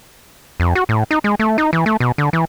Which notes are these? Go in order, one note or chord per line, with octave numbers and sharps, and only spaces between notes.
F2
F#4
A2
D#4
G#3
A3
D#4
E3
A3
B2
D3
E3